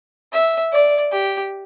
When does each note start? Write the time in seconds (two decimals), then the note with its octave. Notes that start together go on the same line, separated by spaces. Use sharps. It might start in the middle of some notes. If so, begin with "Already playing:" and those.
0.33 E5
0.72 D5
1.12 G4